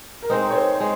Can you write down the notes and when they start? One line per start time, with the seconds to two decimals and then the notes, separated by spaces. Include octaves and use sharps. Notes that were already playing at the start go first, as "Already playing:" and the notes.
0.23 A#4
0.30 G#3 C4 D#4 C5
0.51 C#5
0.55 C5
0.80 G#3